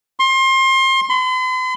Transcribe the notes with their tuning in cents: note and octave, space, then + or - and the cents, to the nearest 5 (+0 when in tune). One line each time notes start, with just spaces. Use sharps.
C6 +30
C6 -45